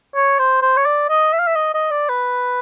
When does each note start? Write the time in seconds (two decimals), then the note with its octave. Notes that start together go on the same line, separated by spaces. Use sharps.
0.15 C#5
0.39 C5
0.62 C5
0.77 C#5
0.86 D5
1.10 D#5
1.33 E5
1.39 F5
1.47 E5
1.56 D#5
1.74 D#5
1.91 D5
2.09 B4